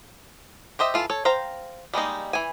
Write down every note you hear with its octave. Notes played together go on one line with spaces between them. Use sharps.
G4 C5 D#5 E5
E3 F4 A4
A4 C#5
C5 F5 G5 A#5
G3 G#3 A#3 D#4
E3 G#5